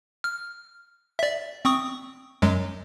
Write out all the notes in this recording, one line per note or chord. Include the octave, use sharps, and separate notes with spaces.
F6
D5 E5
C4 C#6 D#6
F#2 F#3 G#3